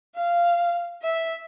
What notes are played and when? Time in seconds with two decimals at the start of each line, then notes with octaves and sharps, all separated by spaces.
0.16 F5
1.03 E5